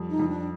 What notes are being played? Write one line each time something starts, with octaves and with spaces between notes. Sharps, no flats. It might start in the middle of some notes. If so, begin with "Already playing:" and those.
Already playing: F2 G3
D#4
F2
D4